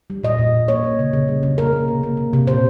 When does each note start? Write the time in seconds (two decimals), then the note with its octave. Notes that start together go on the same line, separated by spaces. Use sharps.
0.10 G3
0.23 A#2 D#5
0.39 A#2
0.54 A#2
0.68 A#3 C#5
0.84 A#3
0.99 C#3
1.13 C#3
1.28 G3
1.43 C#3
1.58 A#3 A#4
1.73 A#3
1.88 C3
2.03 A#3
2.17 C3
2.33 C3
2.47 A#2 C5